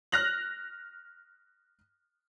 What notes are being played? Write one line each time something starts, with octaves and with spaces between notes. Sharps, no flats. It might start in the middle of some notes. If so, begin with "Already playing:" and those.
F6 F#6 A#6 F7 F#7